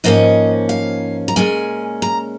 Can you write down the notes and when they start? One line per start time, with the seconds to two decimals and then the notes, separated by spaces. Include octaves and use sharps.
0.04 G#2 F3 A#3 C#4 D#5
0.69 F5
1.28 A#5
1.36 A#2 G#3 C#4 G#5
2.02 A#5